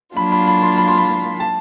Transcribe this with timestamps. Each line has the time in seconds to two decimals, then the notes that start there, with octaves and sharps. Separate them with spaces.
0.17 F#3 A#3 D4 F4 B5
0.32 B5
0.47 B5
0.63 C6
0.78 B5
0.88 C6
0.98 B5
1.40 A5